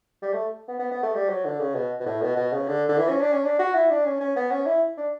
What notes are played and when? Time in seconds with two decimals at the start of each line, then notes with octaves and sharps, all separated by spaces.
0.22 G3
0.33 A3
0.68 B3
0.79 B3
0.91 B3
1.03 A3
1.14 G3
1.29 F#3
1.45 D3
1.60 C#3
1.75 B2
2.00 B2
2.06 A2
2.22 B2
2.37 B2
2.53 C#3
2.68 D3
2.89 D3
2.98 E3
3.09 C#4
3.21 D4
3.32 C#4
3.44 D4
3.59 F#4
3.75 E4
3.90 D4
4.05 C#4
4.21 C#4
4.36 B3
4.51 C#4
4.66 E4
4.97 D4